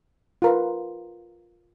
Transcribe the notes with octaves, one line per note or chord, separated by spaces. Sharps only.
F4 A#4 B4